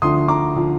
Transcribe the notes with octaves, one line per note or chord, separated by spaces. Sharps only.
D2 D3 F3 C6 D#6
A#5 D6
D3 F3